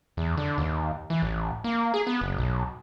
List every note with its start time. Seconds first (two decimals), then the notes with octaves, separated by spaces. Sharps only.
0.17 E2
0.37 D3
0.58 D#2
1.10 E3
1.22 A1
1.64 A#3
1.94 G#4
2.07 B3
2.21 F#1
2.38 B1